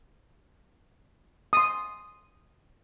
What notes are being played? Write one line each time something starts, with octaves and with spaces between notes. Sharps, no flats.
C6 D#6